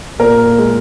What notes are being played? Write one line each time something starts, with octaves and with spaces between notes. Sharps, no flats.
A#2 A#4
G#3